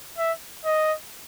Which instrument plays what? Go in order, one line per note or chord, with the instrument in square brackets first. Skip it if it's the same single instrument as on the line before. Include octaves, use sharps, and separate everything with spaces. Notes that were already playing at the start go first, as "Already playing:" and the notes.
[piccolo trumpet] E5
D#5